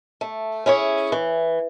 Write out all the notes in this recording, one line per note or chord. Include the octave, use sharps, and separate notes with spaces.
A3
C#4 E4 G#4 C#5
E3